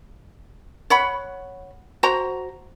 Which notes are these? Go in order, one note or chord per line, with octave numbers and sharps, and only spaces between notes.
C#5 F#5 B5
F#4 C5 A#5